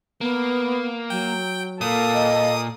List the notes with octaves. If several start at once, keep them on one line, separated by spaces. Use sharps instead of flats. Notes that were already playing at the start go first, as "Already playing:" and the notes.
A#3 B3
F#3 G5
A#2 A#3 A4 D#6
D#5